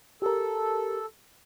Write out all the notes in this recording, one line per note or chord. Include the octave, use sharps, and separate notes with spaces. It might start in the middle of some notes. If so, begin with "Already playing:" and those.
G4 A4 A#4